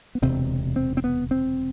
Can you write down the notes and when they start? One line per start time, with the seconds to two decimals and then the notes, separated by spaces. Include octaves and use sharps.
0.15 B3
0.22 E1 D2 C3 C4
0.76 C4
0.97 C4
1.04 B3
1.31 C4